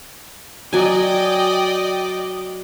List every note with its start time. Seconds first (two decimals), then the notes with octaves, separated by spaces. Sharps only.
0.73 F#3 D5 D#5 G5 G#5